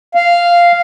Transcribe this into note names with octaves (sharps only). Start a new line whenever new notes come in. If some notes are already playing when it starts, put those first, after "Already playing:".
F5